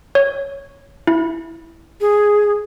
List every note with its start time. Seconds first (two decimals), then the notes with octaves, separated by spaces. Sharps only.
0.15 C#5
1.07 E4
2.01 G#4